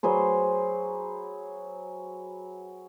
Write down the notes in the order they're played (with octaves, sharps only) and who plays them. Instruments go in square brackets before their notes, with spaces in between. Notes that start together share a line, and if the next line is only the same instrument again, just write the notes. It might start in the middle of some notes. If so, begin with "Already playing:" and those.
[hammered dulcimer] F#3 G#4 B4 C5